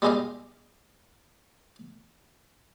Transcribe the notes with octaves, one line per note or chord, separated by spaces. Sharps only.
G3 G#3 E4 G4 D#5 F5